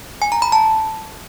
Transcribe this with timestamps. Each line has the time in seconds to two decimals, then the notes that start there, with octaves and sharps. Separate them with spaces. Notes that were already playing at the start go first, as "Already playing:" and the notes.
0.22 G#5
0.32 A#5
0.42 B5
0.52 A5